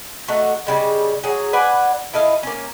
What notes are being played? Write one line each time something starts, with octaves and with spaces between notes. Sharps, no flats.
A3 D4 D#4 F#4
C#3 G3 G#3
F#3 G#4
B4 D5 F#5 G#5
E4 A4 D#5 F5
A#3 C#4